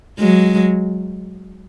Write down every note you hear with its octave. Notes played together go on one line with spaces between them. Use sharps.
F#3 G#3